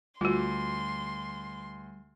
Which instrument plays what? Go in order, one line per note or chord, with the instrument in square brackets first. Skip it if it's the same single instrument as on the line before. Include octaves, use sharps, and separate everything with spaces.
[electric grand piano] D2 [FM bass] G3 [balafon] F4 F#4 [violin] C6